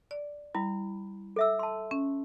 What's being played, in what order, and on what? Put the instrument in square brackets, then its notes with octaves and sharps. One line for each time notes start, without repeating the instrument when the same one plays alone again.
[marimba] D5
[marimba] G3 [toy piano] E4 B5
[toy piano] A4 E5 E6
A5 C6
[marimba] C#4